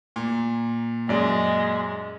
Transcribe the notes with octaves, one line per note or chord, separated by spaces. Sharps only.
A#2
F#2 G#3 D5 D#5